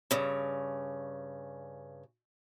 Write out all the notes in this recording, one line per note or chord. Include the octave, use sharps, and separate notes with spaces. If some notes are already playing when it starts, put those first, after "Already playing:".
G2 C#3